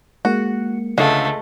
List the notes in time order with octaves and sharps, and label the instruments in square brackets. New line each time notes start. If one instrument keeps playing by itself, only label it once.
[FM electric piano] G#3 A#3 C#7 [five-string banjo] F#4
[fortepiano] C#2 D3 F5 [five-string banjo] G#3 [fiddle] A3